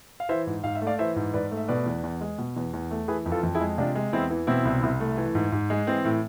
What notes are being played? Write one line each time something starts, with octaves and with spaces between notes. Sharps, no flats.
F5
E3 C5 E5
G#2
G#2 F5
E5
A3
D5 F5
E3 C5 E5
G#2
G#2 B4 D5
A3
E5
B2 B4 D5
E2
E2
G#3
B2
E2
E2
A3
E3 G#4 B4
F2
F4 A4
F2
E4 G#4
G#3
C3 D4 F4
G#3
E2 C4 E4
E3
B2 C4 E4
C2
C2
A3
E3
G#2
G#2
G#3
E3 C4
A2